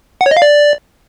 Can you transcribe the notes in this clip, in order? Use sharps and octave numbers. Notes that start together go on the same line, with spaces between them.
F#5
C#5
D#5
F5
D5